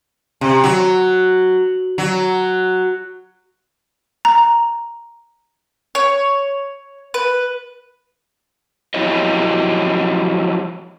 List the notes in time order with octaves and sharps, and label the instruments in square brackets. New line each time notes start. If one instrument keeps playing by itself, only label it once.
[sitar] C3
F#3
F#3
[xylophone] A#5
[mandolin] C#5
B4
[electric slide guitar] F3 F#3 E4 G4 C#5 D#5